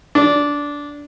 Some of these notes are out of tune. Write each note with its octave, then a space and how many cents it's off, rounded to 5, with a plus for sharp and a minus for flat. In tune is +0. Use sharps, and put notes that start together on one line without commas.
D4 -15